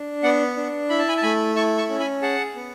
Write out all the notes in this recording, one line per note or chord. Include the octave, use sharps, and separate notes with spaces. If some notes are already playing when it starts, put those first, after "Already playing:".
Already playing: D4
B3 D5 F#5
D4
E4 B5
A5
G#5 B5
A5
A3 G#5 B5
E4 A5 C#6
A5 C#6
C#4
G#5 B5
G#4 F#5 A5
B3